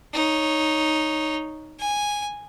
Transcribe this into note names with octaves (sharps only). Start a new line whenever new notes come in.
D#4 C#5
G#5